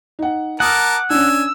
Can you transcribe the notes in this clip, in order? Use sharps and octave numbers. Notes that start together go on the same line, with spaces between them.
D#4 F#5
A#4 F#5 A5 D6 D#6 F6
C#4 D4 G#5 E6